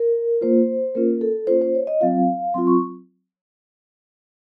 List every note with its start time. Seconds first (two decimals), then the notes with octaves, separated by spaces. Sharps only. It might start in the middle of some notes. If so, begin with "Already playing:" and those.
Already playing: A#4
0.41 A#3 F4 C5
0.95 A#3 C#4 F4 A#4
1.21 A4
1.47 A#3 C#4 F4 C5
1.61 C5
1.75 C#5
1.87 D#5
2.01 F#3 C4 F4 F5
2.54 F#3 C4 F4 C6
2.67 C#6